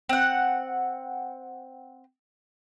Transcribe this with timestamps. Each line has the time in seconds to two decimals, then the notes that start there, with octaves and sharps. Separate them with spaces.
0.09 C4 F#5